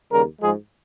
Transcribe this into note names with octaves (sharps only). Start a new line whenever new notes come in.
D#2 C#3 G3 A#4
G#2 F3 G#3 G#4